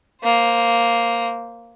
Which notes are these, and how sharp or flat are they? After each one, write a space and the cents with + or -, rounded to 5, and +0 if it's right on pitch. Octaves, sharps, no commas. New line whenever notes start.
A#3 +0 C5 +0